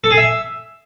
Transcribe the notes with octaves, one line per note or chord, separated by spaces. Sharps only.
A4
G#4
E5